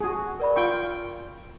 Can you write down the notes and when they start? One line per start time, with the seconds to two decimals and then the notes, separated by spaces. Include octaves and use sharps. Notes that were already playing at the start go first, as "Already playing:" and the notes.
0.01 F#4 G#4
0.40 A#4 D5 B5
0.56 F4 G5 C#6